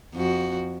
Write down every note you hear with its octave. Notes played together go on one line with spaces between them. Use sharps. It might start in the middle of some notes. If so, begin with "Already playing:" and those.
F2 F#4